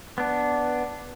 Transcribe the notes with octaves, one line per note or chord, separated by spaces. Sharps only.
B3 D4